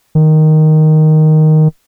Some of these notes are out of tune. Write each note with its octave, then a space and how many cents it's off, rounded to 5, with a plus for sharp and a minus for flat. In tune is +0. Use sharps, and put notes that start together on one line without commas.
D#3 +0